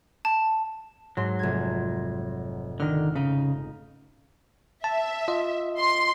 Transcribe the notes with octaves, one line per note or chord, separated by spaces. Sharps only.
A5
G#2 F#3 C6
F1 G#6
D3 D#3 F6
C#3 D#4
E5 A5
F4 D#5
C6